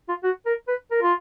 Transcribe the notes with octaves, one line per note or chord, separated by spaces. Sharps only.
F4
F#4
A#4
B4
A#4
F4